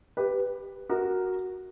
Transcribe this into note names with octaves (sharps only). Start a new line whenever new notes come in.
G4 B4
F#4 A#4